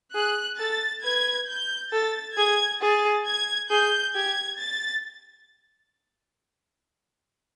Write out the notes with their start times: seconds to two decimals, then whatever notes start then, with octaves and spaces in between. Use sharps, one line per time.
0.15 G#4 F#6
0.59 A4 A6
1.04 B4 G#6
1.48 G6
1.92 A4 A6
2.37 G#4 G#6
2.81 G#4 A6
3.26 G#6
3.70 G#4 G6
4.15 G4 G#6
4.59 A6